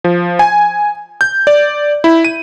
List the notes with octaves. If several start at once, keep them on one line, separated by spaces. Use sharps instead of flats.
F3
G#5
G6
D5
E4
D#7